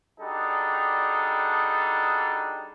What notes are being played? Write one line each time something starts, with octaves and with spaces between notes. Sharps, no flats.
G3 D4 D#4 F#4 G#4 A4